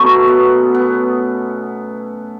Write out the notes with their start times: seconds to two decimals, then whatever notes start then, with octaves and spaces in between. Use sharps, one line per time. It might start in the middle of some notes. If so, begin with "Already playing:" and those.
Already playing: B2 F#3 A3 C#4
0.28 B3
0.74 B3